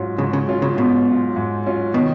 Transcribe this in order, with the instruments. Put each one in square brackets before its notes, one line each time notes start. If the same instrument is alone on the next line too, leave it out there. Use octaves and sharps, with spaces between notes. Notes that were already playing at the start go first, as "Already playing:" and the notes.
Already playing: [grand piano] G#2 F#3 C#4 F4
[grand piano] G#2 [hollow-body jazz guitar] C#3
[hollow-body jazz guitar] C#3
[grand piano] F#3 C#4 F4
[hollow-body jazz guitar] C#3
[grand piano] G#2 [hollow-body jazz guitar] B2
[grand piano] F#3 C#4 F4
G#2
F#3 C#4 F4
[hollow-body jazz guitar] B2 [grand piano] D#3